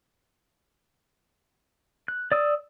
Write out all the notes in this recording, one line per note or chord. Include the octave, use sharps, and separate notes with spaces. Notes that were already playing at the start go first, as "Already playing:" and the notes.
F#6
D5 D#6 E6